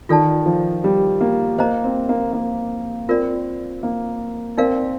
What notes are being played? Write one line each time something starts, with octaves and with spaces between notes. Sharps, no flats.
D#3 F4 A4 D5 A5
F3
G3
A#3
A#3 C5 D#5 A#5
C4
A#3
A#3
C4 F4 A#4 D5
A#3
C4 D#4 A#4 D5 F5